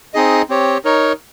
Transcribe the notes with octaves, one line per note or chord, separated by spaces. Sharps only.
C4 D#4 G#4 D#5
C4 G4 C#5
D#4 A#4 C#5